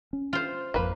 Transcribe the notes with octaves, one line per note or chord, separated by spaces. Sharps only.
C#4
F4 C5
G#1 F2 A#3 B4